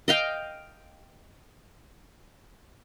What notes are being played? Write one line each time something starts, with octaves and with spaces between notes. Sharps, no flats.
D#5 F5 G5